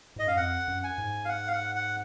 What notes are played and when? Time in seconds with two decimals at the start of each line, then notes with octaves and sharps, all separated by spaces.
0.16 G#2 D#5
0.27 F#2 F5
0.36 F2 F#5
0.68 F#2
0.84 G#5
0.98 G#2
1.25 F5
1.29 F#5
1.48 F5
1.52 F#5
1.75 F#5